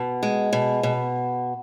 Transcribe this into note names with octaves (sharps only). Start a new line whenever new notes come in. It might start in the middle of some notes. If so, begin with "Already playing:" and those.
Already playing: B2
G#3
B2
B2